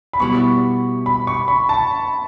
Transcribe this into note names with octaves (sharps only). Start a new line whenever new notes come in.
B5
B2 G3 B3 E4 C#6
B5
C#6
B5
A5